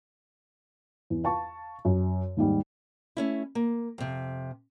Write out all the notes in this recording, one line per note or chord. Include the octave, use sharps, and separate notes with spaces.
E2
F5 A5 C#6
F#2
D#2 G#2 G3
A3 C#4 E4
A#3
F2 C3